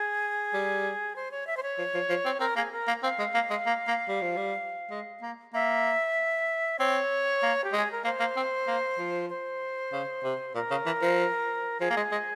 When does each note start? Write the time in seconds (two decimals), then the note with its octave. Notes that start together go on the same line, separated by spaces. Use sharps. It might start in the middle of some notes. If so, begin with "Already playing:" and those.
Already playing: G#4
0.54 G3
1.16 C5
1.31 C#5
1.47 E5
1.57 C5
1.63 C#5
1.78 F3
1.94 F3
2.10 F3
2.25 C4
2.40 C4 A#4
2.56 A#3 G#4
2.72 A#4
2.88 A#3
3.03 C4 F5
3.19 G#3
3.35 A#3
3.50 G#3
3.66 A#3
3.87 A#3
4.09 G3
4.22 F3
4.37 G3
4.91 G#3
5.22 A#3
5.54 A#3 E5
6.79 C4 C#5
7.43 A#3
7.64 G4
7.73 G#3 G#4
7.92 A#4
8.04 A#3 C5
8.20 A#3
8.37 C4
8.68 A#3
8.99 F3
9.30 C5
9.93 C#3
10.24 C3
10.55 A#2 A#4
10.71 C#3
10.86 E3
11.02 F3
11.81 F3 G#4
11.90 A#3
11.97 G#3
12.12 G#3